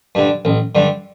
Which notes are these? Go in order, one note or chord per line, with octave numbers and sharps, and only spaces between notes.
G2 D3
A1
G2 D3